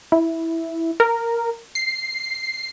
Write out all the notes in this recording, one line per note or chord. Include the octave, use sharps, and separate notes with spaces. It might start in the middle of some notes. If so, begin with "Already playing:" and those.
E4
A#4
C7